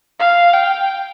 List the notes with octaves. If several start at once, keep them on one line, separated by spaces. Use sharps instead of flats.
F5
G5